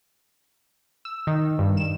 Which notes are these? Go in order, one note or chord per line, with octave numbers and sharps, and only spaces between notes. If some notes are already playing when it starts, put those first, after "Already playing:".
E6
D#3
G2
E7